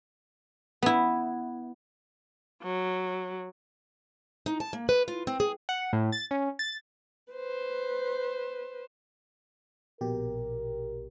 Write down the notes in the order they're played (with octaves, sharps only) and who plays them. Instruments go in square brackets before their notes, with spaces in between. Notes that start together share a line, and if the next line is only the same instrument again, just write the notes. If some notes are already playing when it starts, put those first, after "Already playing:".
[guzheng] B3 E4
[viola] F#3
[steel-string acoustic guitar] D#4
A5
A#3
B4
F4
C4
G#4
[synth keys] F#5
A2
A6
C#4
A6
[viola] B4 C5
[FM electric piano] A#1 B2 G4 [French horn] A#4